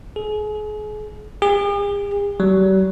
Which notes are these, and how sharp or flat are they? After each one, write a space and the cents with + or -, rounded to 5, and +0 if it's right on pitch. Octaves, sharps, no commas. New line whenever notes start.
G#4 +35
G#4 -45
G3 -45